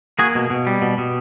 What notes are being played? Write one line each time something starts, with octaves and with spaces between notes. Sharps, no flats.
A#3 F#4 G#4
B2
B2
G3
B2
B2